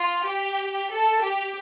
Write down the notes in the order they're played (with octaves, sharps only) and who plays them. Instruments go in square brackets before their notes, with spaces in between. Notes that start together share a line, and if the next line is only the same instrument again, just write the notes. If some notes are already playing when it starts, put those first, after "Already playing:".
Already playing: [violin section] F4
G4
A4
G4